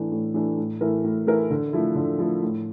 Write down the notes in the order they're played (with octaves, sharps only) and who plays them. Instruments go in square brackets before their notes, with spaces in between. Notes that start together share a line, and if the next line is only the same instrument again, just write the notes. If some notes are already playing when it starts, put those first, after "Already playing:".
Already playing: [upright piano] A2 E3 A3 D4
A2
E3 A3 D4
A2
E3 A3 E4 A#4
A2
E3 A3 E4 A#4
D3
F3 A3 E4
D3
F3 A3 E4
A2